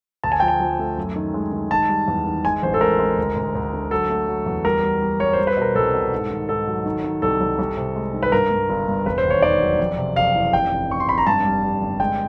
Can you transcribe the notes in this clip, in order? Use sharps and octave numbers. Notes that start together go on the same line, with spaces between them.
D2 A5
G#5
F3 G5
G#5
F3
A3
F#2
D#3
G#3
D#3
D#3 A5
G3
E2
D#3
G#3 G#5
A1 C5
A4
G#3 A#4
G#3
D2
D2
D2
D3
F#3 A4
A3
F#3
E2
G3 A#4
G3
G3
G3 C#5
C5
G3
B4
B2 A#4
C2 A4
B2
G#2
D#3
G#2 A4
F#3
D#3
D#3
C2 A4
C2
C2
C3
G#3
D#3
B4
G2 A#4
G2
G1
G2
E1 B4
C5
D#2
C#5
D#3 D5
F#3
F2
C3
F#1 F5
E3
F1 G5
F1
F1 C#6
C6
F1 B5
A#5
G2 A5
G3
G3
G1
G#3 G5